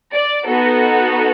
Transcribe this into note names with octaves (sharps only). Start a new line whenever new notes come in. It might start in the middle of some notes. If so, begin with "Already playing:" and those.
D5
B3 D#4 F#4 A4